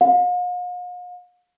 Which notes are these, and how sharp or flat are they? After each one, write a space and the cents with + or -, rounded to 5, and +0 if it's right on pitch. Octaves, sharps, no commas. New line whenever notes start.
F5 +45